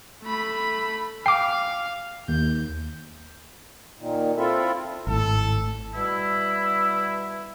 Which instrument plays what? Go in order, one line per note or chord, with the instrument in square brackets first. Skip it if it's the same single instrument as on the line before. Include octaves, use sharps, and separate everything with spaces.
[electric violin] A3 B5
[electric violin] F5 [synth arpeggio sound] G5 D6 [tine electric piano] C7
[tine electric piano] D#2 [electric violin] G6
[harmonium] A#2 D#3
C4 E4 F4 A4 E5
[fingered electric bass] G#1 A2 [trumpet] A4
[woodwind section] B2 G3 E4